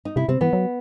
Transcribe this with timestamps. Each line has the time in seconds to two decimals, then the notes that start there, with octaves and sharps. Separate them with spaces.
0.05 D#4
0.16 C3 E4
0.29 C3 C4
0.41 E3 B3
0.53 F#3